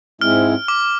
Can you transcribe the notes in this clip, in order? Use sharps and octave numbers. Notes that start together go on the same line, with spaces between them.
G#2 G#3 C4 E4 F6
D6